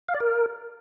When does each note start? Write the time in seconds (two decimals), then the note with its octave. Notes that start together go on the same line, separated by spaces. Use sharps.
0.08 F5
0.14 D5
0.20 A#4